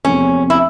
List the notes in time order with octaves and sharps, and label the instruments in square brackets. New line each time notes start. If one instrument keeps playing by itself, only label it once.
[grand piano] E2 C3 F3 A3 C4 [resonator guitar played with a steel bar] C#4
[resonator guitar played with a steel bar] E4